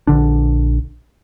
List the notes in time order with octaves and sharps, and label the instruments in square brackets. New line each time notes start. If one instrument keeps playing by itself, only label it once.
[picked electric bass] A#1 D3 D4